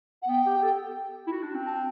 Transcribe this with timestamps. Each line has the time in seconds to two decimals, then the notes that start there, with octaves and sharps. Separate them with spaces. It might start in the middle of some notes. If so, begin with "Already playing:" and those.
0.22 F#5
0.28 B3 G5
0.46 G4
0.57 G4
0.63 A4
1.27 E4
1.32 F#4
1.43 D4
1.54 C4
1.67 A5